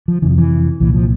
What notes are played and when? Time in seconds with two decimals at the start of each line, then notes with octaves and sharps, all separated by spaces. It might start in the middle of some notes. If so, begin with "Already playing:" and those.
0.08 F3
0.22 F2 C3 E3
0.30 F3
0.38 E3
0.80 C2 A#2 E3
0.94 F3